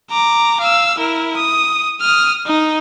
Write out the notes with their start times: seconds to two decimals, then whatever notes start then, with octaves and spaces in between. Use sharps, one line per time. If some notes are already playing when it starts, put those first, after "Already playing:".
0.11 A#5 D6
0.60 F5 E6
0.98 E4 A#4
1.37 D#6
2.01 D#6 F6
2.46 D#4